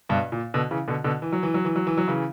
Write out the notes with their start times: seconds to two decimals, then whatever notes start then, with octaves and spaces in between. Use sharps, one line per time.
0.09 G2 B2
0.32 A#2
0.54 B2 D3
0.71 C#3 E3
0.88 B2 D3
1.04 B2 D3
1.22 E3
1.33 F#3
1.43 E3
1.54 F#3
1.65 E3
1.76 F#3
1.87 E3
1.98 F#3
2.08 C#3 E3